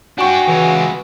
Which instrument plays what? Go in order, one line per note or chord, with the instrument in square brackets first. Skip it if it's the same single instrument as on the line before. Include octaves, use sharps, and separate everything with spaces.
[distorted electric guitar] D4 G5 [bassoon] F#4 [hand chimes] G#5 C#6
[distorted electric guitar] C#3 G#3 [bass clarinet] E3